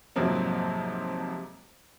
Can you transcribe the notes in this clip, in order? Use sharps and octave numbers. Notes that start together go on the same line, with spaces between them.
F2 G#2 C3 F3 F#3 A#3